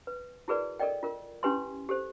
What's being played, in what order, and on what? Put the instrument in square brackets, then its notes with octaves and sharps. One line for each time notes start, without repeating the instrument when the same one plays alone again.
[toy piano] B4
E4 F#4 G#4 A#4 B4 D5
A4 A#4 D5 D#5 G5
F4 A#4
C#4 E4 G4 B4 G#5 C6
G4 A4 C5